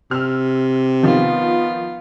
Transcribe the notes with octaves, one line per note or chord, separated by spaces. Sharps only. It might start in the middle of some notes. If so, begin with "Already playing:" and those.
C3 E6 F6
D#3 F3 B3 F4